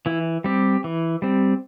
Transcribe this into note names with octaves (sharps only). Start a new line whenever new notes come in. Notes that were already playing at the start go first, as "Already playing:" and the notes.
E3 E4
G3 C4 G4
E3
G3 C4